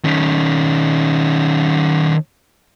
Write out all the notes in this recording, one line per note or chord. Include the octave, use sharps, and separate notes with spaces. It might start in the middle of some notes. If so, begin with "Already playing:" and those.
D#3 C#4